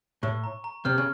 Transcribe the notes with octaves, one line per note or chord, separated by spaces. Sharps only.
A2 C#6
A#5
A#5
C3 F6
C#3